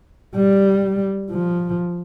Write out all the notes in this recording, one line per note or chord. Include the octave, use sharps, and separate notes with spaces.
G3
F3